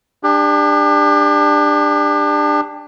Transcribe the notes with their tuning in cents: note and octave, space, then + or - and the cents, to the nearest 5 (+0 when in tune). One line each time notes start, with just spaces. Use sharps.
D4 +10 G4 +40